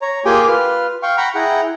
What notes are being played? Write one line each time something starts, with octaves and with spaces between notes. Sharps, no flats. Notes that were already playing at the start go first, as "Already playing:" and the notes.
C#5 A#5
A#3 F4 G4 G#4 G5 G#5
F4 B4 F6
F5 G5 C#6
F#5 G5 A#5 B5 C#6
E4 G#4 F#5 G5 A#5